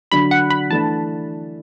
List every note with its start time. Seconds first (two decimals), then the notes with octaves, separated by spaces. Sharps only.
0.12 D3 F#3 D4 F#4 B5
0.31 F#5
0.50 B5
0.70 E3 A3 D4 A5